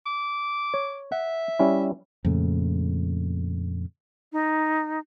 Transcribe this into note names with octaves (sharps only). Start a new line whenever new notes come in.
D6
C#5
E5 F#5
G3 C#4 E4
F2 A#2 C#3 A3
D#4